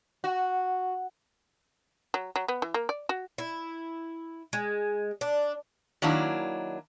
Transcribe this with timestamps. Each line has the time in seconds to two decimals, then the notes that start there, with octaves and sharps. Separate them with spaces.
0.24 F#4
2.14 F#3
2.36 F#3
2.48 B3
2.62 E3
2.74 A#3
2.89 D5
3.09 F#4
3.38 E4
4.53 G#3
5.21 D4
6.02 D#3 F#3 A#3 D4 E4